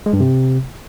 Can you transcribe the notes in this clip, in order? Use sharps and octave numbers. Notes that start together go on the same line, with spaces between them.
G#3
G2
C3